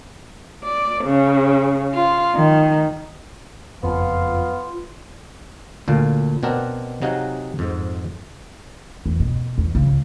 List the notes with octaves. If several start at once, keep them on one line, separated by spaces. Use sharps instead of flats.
D5
C#3
F4
D#3
F#1 F2 B3 F4 F5 C6
D2 A#2 F5
B2 C4 D4 A#4 F#5
C3 F#3 D#4 G#4 F5 F#5
F2 G#2
E2
B2
E2
C#2